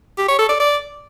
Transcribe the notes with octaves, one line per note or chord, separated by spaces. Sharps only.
G4
C#5
A4
D5
D5